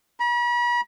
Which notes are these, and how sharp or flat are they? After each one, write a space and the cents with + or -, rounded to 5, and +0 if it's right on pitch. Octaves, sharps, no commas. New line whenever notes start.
B5 -45